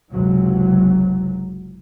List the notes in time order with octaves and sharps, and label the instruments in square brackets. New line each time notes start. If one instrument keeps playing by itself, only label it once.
[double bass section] F#1 C#2 C3 F#3